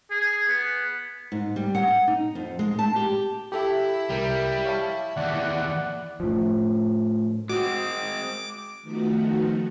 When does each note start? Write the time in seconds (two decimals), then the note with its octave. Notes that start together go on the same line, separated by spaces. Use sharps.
0.11 G#4
0.49 B3
1.32 G#2
1.56 G3
1.75 F#5
2.07 D#4
2.35 F2
2.59 G#3
2.79 A5
2.96 G4
3.52 E4 G4 A4 E5
4.10 C2 G3 A#4
4.66 C#5 F5 A5
5.17 D#2 E3 D5 F#5
6.20 A2 F3
7.50 G#3 C4 F#4 D6
8.82 D#3 F3 A3 B3 D#4 F#4